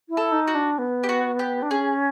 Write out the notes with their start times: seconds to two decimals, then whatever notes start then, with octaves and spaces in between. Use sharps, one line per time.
0.09 E4
0.17 A4
0.32 D#4
0.47 F#4
0.55 D4
0.78 B3
1.03 G4
1.09 F#4
1.39 G4
1.62 D4
1.70 C#4 G#4